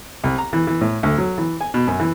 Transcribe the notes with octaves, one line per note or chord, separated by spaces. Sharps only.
C2
A#5
E3
E3
A2
D2
F#3
E3
G#5
B2
F#2
E3